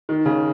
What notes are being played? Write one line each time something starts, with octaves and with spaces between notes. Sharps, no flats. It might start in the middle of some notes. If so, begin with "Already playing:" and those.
D#3
C#3